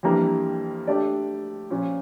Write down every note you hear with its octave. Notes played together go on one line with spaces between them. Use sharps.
F2 E3 G3 A#3 D4
A3 D4 G4 D5
A#2 F3 C#4 F4